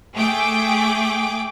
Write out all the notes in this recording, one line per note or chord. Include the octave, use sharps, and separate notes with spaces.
A3 G#4 G5 D6